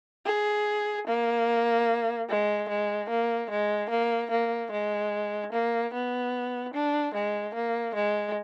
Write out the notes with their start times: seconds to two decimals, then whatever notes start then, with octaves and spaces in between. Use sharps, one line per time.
0.26 G#4
1.07 A#3
2.29 G#3
2.69 G#3
3.09 A#3
3.50 G#3
3.90 A#3
4.31 A#3
4.71 G#3
5.53 A#3
5.93 B3
6.74 D4
7.14 G#3
7.55 A#3
7.95 G#3